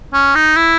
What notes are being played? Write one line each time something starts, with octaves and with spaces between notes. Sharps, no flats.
C#4
D#4
E4